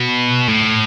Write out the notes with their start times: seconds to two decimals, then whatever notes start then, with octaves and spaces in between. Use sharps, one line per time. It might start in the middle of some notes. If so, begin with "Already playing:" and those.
Already playing: B2
0.48 A2